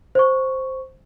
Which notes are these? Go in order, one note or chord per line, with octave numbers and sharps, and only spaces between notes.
C5 C#6